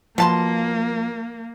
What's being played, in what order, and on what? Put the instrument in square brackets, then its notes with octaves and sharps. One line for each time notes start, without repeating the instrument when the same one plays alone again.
[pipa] B2 A5 C6 [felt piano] F3 [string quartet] A#3